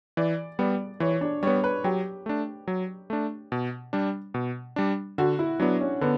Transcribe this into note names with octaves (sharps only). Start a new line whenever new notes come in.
E3 D5
G3 B3 D5
E3 C#5
D4
G3 B3 C#5
B4
F#3 G4
A3 D4
F#3
A3 D4
B2
G3 D4
B2
G3 D4
D3 F#4
E4
F#3 B3 D4
C#4
D3 B3